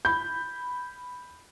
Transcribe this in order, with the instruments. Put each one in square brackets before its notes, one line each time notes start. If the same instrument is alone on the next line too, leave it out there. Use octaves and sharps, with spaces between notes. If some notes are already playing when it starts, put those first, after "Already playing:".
[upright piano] B5 G6